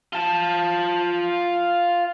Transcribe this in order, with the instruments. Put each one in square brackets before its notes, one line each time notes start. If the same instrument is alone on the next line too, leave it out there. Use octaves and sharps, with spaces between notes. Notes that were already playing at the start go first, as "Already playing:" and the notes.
[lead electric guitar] F4 A5